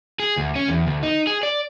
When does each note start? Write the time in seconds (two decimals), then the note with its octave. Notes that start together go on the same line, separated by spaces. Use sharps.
0.20 G#4
0.37 D2
0.56 C#4
0.68 E2
0.87 D2
1.03 D#4
1.27 G#4
1.43 D5